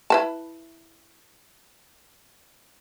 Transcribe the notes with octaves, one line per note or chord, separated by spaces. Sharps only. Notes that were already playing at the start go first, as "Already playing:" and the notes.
E4 B4 A5